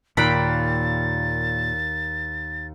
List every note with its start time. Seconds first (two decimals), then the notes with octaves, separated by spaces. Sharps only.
0.17 D#2 A#2 G5 A#5 B5 F#6 A6 D7